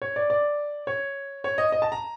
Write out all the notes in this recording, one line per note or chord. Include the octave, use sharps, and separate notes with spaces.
C#5
D5
D5
C#5
C#5
D#5
D#5
A5
A#5